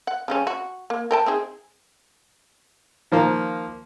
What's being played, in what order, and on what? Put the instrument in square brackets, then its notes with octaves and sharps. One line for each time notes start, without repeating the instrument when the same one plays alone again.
[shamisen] F#5
C#3 G3 C#4
F#4
A#3
A#4 G5 A5
C4 D#4 G#4
[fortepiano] D#3 F3 A#3